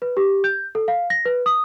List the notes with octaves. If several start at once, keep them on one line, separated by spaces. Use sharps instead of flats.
B4
G4
G6
A4
F5
A#6
B4
D#6